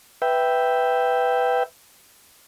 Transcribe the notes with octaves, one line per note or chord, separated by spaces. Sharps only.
B4 E5 G5